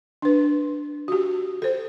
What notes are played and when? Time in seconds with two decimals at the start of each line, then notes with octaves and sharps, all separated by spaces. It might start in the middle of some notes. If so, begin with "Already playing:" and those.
0.22 D4 B4
1.08 F#4 G4
1.62 A4 C5